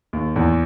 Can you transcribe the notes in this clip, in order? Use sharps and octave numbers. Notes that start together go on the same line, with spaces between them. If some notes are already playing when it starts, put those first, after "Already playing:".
D#2
E2